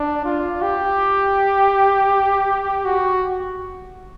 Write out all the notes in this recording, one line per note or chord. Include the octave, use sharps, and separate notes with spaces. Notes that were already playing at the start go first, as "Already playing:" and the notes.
Already playing: D4
F4
G4
F#4